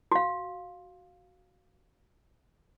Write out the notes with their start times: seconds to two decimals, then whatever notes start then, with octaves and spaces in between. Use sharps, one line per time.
0.11 F#4 F5